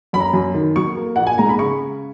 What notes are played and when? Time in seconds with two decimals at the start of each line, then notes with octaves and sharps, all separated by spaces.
0.13 F#2 B5
0.20 A#5
0.33 F#2
0.54 D#3
0.76 F#3 C#6
0.97 A#3
1.16 A#1 F#5
1.27 G#5
1.38 G#2 A#5
1.49 B5
1.59 C#3 C#6